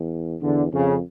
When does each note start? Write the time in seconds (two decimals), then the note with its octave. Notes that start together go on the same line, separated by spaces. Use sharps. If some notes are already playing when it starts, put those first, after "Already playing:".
Already playing: E2
0.42 E2 D3
0.73 F2 C#3